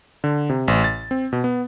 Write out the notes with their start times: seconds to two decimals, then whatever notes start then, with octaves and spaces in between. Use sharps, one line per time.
0.24 D3
0.50 C3
0.68 A1
0.84 A6
1.11 C4
1.33 B2
1.44 B3